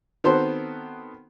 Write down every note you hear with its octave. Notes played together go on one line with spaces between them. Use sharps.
D#3 B3 C4 F#4 A4 C5